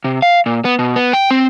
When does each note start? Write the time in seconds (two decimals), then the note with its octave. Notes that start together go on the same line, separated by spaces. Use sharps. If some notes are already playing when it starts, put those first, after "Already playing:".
0.04 C3
0.22 F5
0.46 A#2
0.65 B3
0.79 B2
0.96 B3
1.13 G5
1.31 C4